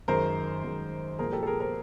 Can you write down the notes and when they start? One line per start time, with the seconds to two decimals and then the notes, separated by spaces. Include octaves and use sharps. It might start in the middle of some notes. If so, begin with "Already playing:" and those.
0.08 F#2 D#3 G#3 A#4 C5
0.64 F#2 D#3 G#3
1.19 C2 A#2 F3 G#3 G#4 A#4
1.33 G4 A4
1.43 A4
1.46 G#4 A#4
1.60 A#4 C5